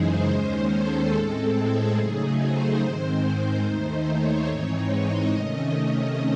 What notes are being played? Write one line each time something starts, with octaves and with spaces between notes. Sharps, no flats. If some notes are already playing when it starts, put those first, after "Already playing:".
Already playing: F#2 C#3 E3 G#3 D#4 G#4 C5
D#2 D#3 G#3 C#4
A4
A2 G#3 C4 A4
G#4
C#3 F#3 A3 D#4 G#4
C5
G#2 D#3 G#3 C4
D#2 D#3 A3 D#4 C5
C#5
G#2 E3 G#3 C4 D#4
D#5
C3 D#3 A3 C#4